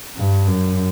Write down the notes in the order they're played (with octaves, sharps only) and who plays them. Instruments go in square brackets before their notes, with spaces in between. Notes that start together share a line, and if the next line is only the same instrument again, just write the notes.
[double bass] G2
F#2